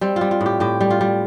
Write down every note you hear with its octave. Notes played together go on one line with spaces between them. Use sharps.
G3 C4
F4
G3
F4
A2
G4
A2 G4
G3
F4
G3